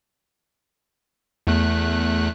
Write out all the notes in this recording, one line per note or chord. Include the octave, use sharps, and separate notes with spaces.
E2 A3 F#6